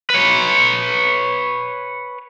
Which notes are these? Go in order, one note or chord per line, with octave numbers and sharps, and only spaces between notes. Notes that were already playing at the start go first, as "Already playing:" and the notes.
B4 C#5